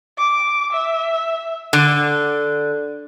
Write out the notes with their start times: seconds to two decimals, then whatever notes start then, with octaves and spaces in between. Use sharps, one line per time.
0.18 D6
0.73 E5
1.73 D3